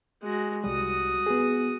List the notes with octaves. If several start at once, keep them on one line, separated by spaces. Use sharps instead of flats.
G#3 F#4
C2 G3 F#4 D#6
B3 G#4